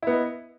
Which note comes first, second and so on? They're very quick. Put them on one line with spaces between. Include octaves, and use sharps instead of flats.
E4 B3 D#5